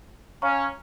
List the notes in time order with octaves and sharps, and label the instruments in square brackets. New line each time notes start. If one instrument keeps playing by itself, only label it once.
[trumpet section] C#4 [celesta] C#5 F5 A#5 C#6